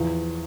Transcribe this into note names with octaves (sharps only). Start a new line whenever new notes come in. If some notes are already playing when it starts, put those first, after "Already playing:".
Already playing: E2 F3